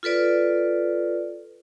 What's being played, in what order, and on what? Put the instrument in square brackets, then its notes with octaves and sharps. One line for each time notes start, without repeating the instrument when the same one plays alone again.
[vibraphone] F4 A4 B4 D5